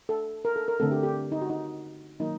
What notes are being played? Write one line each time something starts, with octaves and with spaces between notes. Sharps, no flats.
A4
A#4
A4
A#4
D3 A3 C4 A4
G4
G4
D#4
F#4
D#4
D#3 F#3 A#3 D#4